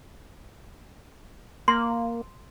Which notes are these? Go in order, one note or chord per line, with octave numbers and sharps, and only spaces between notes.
A#3 C6